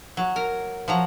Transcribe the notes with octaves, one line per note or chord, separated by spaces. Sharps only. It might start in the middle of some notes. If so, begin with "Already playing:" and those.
F#3
A#4
F3 F#3 A#5